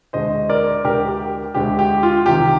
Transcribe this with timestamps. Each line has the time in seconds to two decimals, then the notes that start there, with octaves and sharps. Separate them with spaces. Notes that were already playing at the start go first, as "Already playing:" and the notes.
0.13 D2 D3 G#3 C5 D#5
0.49 A#4 D5
0.84 D2 D3 G#3 G4 A#4
1.08 G4
1.55 D2 D3 G#3 G4
1.79 G4
2.03 F4
2.26 C2 C3 D#3 G4